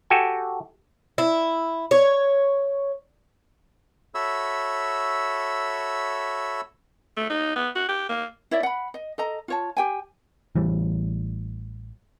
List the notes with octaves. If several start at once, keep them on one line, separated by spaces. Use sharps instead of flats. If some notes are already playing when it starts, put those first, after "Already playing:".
F#4 G4 A4 G5 G#5
E4
C#5
F#4 A4 C#5 E5 B5 E6
A3
D#4
B3
F#4
G4
A#3
E4 C#5 D5 E5
F#5 B5
D#5
A4 D#5 A#5
F4 C#5 A5
G4 G5 G#5
A1 E3 G3